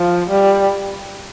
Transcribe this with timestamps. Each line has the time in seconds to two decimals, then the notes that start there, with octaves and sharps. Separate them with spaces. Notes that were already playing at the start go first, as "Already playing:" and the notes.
Already playing: F3
0.30 G3